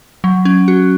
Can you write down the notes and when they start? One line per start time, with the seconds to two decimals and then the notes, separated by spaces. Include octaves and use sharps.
0.24 F#3
0.45 C#4
0.68 F#4